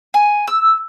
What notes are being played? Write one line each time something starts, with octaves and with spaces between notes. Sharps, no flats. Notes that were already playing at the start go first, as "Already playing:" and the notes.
G#5
E6